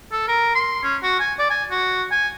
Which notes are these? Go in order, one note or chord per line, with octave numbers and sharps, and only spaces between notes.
A4
A#4
C6
C#4
F#4
G#5
D5
G#5
F#4
G#5